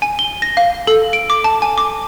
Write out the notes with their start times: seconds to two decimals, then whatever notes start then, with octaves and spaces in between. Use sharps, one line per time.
0.02 G#5
0.19 G7
0.42 A#6
0.57 F5
0.87 A4
1.13 D7
1.30 D6
1.44 A5
1.62 G#5
1.78 D6